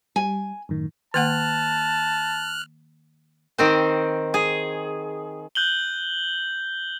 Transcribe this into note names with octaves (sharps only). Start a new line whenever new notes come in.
G3 G#5
F#2 A2 D#3
D#3 A#3 F#5 A5 F6 F#6
D#3 C4 C5
G#4
F#6 G6 F#7 G7